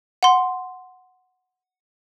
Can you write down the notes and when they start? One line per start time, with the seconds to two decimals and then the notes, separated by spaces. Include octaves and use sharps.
0.23 F#5 C6